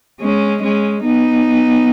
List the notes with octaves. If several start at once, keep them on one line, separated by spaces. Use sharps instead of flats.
G#3 C#4
G#3 C#4
B3 D#4